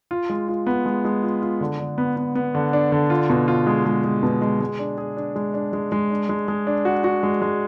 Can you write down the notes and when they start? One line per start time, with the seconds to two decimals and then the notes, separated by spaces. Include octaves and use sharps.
0.11 F4
0.30 G#3
0.48 F4
0.67 B3
0.85 G#3
1.05 G#3
1.23 F4
1.42 F4
1.61 D3
1.79 D3
1.98 B3
2.16 B3
2.35 B3
2.55 D3
2.73 D4
2.92 D3
3.10 F4
3.29 B2
3.48 F4
3.67 G#3
3.85 G#3
4.04 G#3
4.23 B2
4.42 G#3
4.60 G#3
4.79 D4
4.98 G#4
5.17 D4
5.36 G#3
5.54 D4
5.73 G#3
5.92 G#3
6.10 D4
6.29 G#3
6.48 G#3
6.67 D4
6.85 F#4
7.04 F#4
7.23 G#3
7.42 G#3